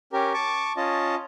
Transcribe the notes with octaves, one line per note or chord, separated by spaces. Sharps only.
C#4 G4 A#4
A5 C#6 D6
C#4 F4 D#5 A5